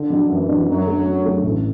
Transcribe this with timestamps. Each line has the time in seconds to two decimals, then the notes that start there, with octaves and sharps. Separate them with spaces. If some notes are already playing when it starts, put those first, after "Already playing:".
Already playing: D3
0.10 F#3 D4
0.29 F#2 E3
0.48 F#3 D4
0.68 F#2 F#3
0.86 D3 A3
1.06 F#2
1.25 D3 A3
1.44 A1